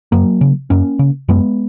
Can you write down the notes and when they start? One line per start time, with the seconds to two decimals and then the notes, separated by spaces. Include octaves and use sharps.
0.12 F#2 F#3 A#3
0.41 C#3
0.70 F#2 A#3 C#4
0.99 C#3
1.29 F#2 G#3 B3